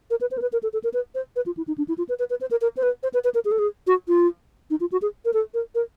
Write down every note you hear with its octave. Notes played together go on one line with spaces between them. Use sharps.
A#4
B4
C5
A#4
B4
A#4
A4
A4
A#4
B4
C5
B4
F4
E4
D#4
D4
E4
F4
B4
B4
B4
C5
A#4
A#4
C5
B4
C5
B4
B4
A#4
G#4
A4
G#4
F#4
F4
D#4
F4
F#4
G#4
A#4
A4
A#4
A#4